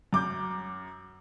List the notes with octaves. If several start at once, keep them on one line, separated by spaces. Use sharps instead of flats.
F#2 D6 G6